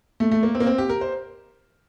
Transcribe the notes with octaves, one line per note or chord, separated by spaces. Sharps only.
A3
A3
A#3
C4
A#3
C4
G4
A#4
C5